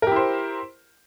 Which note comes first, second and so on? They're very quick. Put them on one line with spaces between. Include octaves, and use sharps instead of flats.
A#4 G4 E4 C5